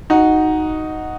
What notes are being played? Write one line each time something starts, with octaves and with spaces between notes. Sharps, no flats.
D#4 F#4